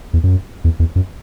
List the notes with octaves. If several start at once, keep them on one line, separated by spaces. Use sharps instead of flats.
E2
F#2
E2
E2
F#2